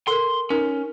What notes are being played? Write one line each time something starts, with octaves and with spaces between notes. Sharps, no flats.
A4 A#4 C6
C#4 D#4 A#4